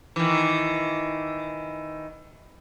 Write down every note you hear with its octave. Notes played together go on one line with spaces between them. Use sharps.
D#3 E3